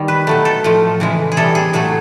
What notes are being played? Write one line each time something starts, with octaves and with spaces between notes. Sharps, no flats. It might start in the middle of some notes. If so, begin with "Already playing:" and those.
Already playing: D#3 G3
B4
B2 F#3 A3
A4
A2 F3 A3
C#3 E3 G#3
G#4
C3 E3 G3 A4
G#4
A2 F#3 A3 G#4